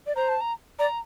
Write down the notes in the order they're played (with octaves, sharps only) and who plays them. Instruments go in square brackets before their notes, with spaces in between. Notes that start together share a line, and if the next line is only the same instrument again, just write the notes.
[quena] D5
[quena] C5 [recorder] A#5
[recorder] A5
A#5
[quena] D5 [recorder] A#5